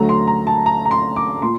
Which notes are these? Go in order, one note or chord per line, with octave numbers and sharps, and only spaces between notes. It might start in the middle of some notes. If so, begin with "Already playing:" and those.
Already playing: D2 D3 F#3 A3 A#5
C6
A#5
A5
A#5
A#5
C6
D6
A#2 C6